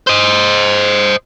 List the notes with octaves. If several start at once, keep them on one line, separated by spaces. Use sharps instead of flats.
C5 D#5